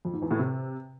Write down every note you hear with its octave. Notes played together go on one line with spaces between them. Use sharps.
F2
G#2
E2
A2
C3